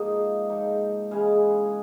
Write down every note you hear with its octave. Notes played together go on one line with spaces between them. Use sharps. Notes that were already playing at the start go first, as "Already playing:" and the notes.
Already playing: G#2 F3 A#3 D#4 D#5 F5
G#2 F3 A#3 D#4
C#3 E3 G#3 D#5 F5